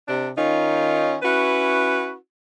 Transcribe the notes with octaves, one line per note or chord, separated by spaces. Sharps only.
C3 D4
D#3 C#4 D#4 F4
C#4 E4 F#4 B4